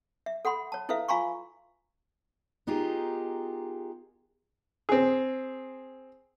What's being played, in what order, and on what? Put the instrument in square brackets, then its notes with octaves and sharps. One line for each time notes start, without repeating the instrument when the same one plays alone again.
[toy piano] E5
A4 F#5 B5 C6
C#5 A5
E4 A4 B4 E5 F5
F4 F5 G#5 A#5 C6 C#6
[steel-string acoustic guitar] B3 D#4 F4 G4 G#4 A#4
[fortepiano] C4 G#4